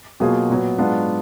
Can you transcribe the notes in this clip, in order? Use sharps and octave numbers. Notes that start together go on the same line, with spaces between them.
B2 F#3 A#3 F4 G#4
A#2 F#3 B3
G#2 F#3 B3 D4 F4